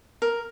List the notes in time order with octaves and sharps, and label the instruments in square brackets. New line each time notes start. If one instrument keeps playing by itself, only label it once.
[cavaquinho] A#4